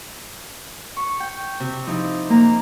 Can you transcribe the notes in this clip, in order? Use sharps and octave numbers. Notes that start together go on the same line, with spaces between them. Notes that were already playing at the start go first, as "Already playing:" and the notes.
C#6
G5
C3
F3 D#4 E4
A#3 A#5